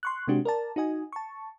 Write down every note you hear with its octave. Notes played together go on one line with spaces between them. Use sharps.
C6 C#6 F#6
C3 G#3 C4 D4 F#4 G4
A#4 D5 A5
D#4 F#4 D#5 G#5
A5 C#6